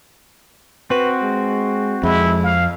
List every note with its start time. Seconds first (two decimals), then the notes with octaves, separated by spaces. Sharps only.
0.90 C4 F#4 B4
1.22 G#3
2.03 F2 G#3 E4
2.44 F5